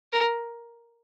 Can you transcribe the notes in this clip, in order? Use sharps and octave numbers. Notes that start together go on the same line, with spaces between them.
A#4